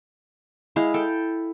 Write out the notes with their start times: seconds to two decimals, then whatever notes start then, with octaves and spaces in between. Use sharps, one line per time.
0.76 G#3 E4 F5
0.94 A4 G5